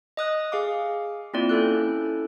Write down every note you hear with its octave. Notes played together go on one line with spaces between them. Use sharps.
D#5 D#6 F#6
G#4 F5 D6
A#3 C4 E4 F4 D5
C#4 E4 A4 F#6